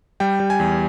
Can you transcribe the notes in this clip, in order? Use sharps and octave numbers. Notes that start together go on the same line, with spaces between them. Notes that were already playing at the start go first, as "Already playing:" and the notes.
G3 G5
G3
G#5
E2